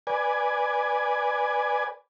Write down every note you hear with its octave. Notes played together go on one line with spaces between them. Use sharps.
B4 D5 G#5